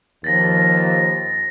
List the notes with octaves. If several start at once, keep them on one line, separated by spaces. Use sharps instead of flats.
D#2 F3 A6 A#6